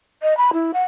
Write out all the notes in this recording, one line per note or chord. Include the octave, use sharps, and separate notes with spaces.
D#5
B5
E4
F#5